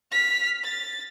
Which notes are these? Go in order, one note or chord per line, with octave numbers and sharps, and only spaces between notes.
F6 B6
A6